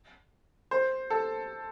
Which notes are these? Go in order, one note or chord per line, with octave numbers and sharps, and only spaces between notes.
C5
A4